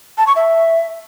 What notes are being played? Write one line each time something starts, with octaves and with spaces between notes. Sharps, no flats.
A5
C#6
E5